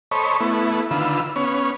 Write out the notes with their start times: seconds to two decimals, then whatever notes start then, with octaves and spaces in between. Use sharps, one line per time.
0.11 A4 C5 C#5 D#5 B5 C#6
0.40 A3 B3 E4
0.91 D3 D#3 F4 B4 E6
1.36 B3 C#4 C#5